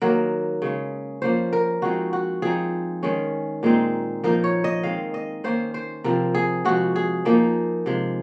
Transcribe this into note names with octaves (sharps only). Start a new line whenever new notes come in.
D#3 F#3 A#3 A#4
C#3 G#3 C#4
F3 A#3 C#4 C5
A#4
F3 G#3 C4 D#4 F#4
F#4
F3 C4 D#4 G#4
D#3 G#3 C#4
A#2 G#3 C4 D#4
F3 A#3 D#4 A#4
C#5
D#5
D#3 G#3 C4 F5
D#5
D#3 A#3 C#4 C5
C5
C3 F3 C4 A#4
G#4
C3 F3 G#3 F#4
G#4
F3 A#3 D#4
C3 F3 G#3